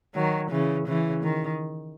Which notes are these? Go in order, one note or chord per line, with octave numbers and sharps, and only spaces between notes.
D#3 F#3
C#3 E3
C#3 E3
D#3